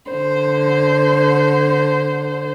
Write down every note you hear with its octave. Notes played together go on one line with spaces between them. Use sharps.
D3 C5